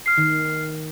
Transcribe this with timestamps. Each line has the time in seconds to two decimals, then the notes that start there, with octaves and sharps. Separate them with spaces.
0.06 F6 C7
0.18 D#3